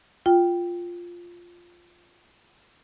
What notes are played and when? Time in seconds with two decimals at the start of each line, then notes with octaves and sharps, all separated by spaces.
0.26 F4 G5